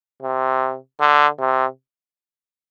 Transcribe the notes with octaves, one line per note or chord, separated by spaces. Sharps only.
C3
D3
C3